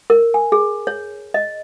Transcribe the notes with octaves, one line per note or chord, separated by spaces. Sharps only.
A#4
G#5
G#4
C#5
D#5